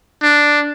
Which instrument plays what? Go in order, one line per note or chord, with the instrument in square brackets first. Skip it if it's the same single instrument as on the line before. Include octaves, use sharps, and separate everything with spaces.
[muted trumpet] D4